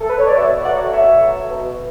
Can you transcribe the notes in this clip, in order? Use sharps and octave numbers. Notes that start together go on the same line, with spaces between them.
A4
B4
C#5
D5
B2 C#5 E5
F#3 A3 D5 F#5
B2 C#5 E5
F#3 A3
B2